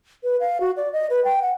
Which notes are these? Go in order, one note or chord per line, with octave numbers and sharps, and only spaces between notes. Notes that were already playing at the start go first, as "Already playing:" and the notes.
B4
F5
F#4
D5
D#5
B4
G5
F#5